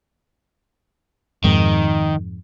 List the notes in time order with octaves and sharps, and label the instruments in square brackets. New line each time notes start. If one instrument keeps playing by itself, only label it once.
[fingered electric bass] F2 G#2 [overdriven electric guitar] D#3